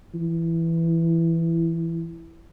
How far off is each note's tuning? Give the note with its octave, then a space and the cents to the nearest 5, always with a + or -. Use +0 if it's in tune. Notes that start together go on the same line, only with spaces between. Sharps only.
E3 +10